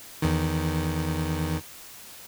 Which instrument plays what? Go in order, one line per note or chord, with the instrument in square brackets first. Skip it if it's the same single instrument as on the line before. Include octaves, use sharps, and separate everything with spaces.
[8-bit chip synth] E2 D#3